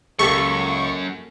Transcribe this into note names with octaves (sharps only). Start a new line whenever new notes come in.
C#2 F#2 A#3 G4 A4 C#6